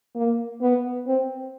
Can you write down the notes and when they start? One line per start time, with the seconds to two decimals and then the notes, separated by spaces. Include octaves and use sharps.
0.16 A#3
0.62 B3
1.07 C4